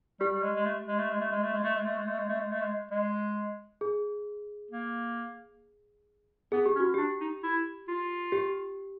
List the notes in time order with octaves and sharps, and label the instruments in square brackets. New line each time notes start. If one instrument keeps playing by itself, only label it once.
[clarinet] G3 [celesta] G4
[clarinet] G3
G#3
G#3
A3
G#3
A3
G#3
A3
G#3
A3
G#3
A3
G#3
A3
G#3
A3
G#3
A3
G#3
A3
G#3
G#3
[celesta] G#4
[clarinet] A#3
[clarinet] B3 [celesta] G#4
[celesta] G4
[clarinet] C#4
[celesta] F#4
[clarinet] D4 [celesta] G4
[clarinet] D#4
E4
F4
[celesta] G4